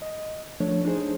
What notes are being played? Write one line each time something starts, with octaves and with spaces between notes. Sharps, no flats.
D#5
F3 A3 D4 C#5
D4 D#4 G#4 C5